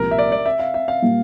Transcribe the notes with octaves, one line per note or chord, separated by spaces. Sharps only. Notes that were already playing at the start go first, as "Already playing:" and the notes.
Already playing: C2 A#2 F3 A#3 A#4
E5
D5
D5
E5
F5
E5
F5
A#2 G3 A#3